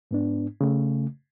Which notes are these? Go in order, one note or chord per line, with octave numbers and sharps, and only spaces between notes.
G#2 B3 D4
C#3 A3